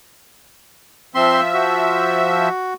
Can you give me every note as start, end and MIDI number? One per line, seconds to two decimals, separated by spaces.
1.15 2.49 53
1.15 1.41 60
1.15 2.49 76
1.15 1.41 84
1.54 2.74 66